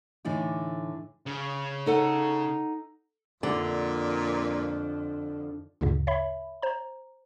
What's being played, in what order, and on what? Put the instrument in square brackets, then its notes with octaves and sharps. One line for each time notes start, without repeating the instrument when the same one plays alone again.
[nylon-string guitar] A2 D3 E3 D4 D#4
[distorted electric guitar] C#3
[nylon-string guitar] D#4 A4 F#5
[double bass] F2 [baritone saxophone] A#2 [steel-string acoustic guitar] D3
[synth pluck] D2 G2 A#2 C#3
C#5 E5 B5
C5 A#5